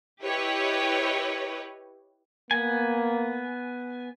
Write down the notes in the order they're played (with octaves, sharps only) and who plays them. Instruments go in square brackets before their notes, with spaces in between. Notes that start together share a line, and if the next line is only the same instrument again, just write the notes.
[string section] E4 G4 B4 C#5 D#5
[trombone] A#3 [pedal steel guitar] B3 G#5